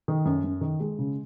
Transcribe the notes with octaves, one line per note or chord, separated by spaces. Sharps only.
D#3
F#2
F#2
D#3
G#3
C#3